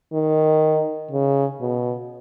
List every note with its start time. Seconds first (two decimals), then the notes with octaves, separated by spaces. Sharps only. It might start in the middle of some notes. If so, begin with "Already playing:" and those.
0.13 D#3
1.11 C#3
1.61 B2